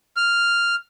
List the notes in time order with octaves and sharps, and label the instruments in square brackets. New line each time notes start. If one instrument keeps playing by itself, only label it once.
[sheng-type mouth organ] F6